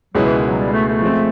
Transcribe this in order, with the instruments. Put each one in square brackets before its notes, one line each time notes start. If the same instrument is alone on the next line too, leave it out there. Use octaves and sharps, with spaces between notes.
[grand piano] C#2 B2 G#3 B3 E4 [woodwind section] F#3
[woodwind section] E3
D#3
F#3
G3
A3
A3
[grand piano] F3 G#3 C4